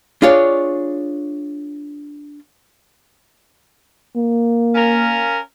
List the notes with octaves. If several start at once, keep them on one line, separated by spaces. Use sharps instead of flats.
D4 F4 G#4 C#5 D5
A#3
C#4 A#4 F5